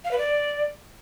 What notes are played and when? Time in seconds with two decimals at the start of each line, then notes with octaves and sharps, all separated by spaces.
0.05 F5
0.11 B4
0.18 D5